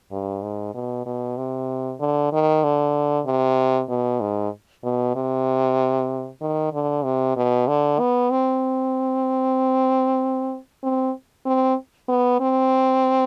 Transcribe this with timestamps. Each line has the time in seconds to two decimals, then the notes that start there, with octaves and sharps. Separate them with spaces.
0.11 G2
0.42 G#2
0.74 B2
1.06 B2
1.37 C3
2.00 D3
2.32 D#3
2.64 D3
3.26 C3
3.89 B2
4.21 G#2
4.84 B2
5.16 C3
6.41 D#3
6.73 D3
7.04 C3
7.36 B2
7.68 D3
7.99 B3
8.31 C4
10.83 C4
11.46 C4
12.08 B3
12.40 C4